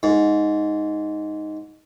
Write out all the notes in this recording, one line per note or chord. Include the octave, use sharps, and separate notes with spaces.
G#2